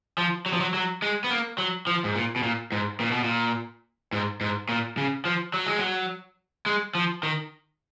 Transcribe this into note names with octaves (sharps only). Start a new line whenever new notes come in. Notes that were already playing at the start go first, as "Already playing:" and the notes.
F3
F#3
F3
F#3
F#3
G#3
B3
A#3
F#3
F3
G#2
A#2
B2
A#2
G#2
A#2
B2
A#2
G#2
G#2
A#2
C#3
F3
F#3
G#3
F#3
G#3
F3
D#3